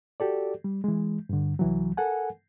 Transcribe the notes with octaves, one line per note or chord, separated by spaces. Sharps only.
F#4 G4 A4 D5
G3
E3 G#3
G2 D3
C2 E3 F#3
A4 A#4 F#5 G#5